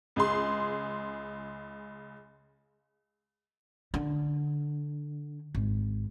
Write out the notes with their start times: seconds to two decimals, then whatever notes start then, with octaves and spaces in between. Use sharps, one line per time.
0.16 C#2 G#4 C6
3.94 D3
5.55 G#1